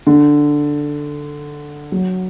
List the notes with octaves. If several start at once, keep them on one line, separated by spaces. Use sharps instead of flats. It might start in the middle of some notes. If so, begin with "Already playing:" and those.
D3
F#3